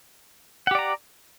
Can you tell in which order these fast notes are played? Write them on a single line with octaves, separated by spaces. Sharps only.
F#5 G4 D5 A#5